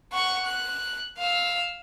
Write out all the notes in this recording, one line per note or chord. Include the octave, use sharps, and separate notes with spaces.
F#5 C#6
F#6
F5 E6